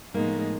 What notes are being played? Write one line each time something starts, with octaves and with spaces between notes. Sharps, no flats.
A2 F3 G#3 A#3 B3 D#4